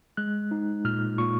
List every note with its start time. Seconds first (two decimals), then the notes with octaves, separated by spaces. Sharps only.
0.17 G#3 F#6
0.51 D#4
0.85 A#2 F6
1.18 A#2 C#6